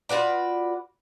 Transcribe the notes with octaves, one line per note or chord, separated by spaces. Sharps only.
F4 F#4 B4 D5